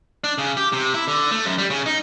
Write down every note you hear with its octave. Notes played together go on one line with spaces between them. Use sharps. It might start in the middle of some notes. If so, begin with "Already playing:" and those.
D4
C#3
G4
C3
E4
D3
A3
F#2
G3
C#3
D#4